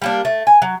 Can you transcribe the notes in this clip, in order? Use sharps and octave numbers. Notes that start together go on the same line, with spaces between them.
G3 A#3 D4
A3
G#5
F#3